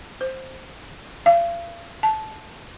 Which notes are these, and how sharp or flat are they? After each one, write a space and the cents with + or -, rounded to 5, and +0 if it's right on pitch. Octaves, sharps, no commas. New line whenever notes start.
C5 +5
F5 -35
A5 -15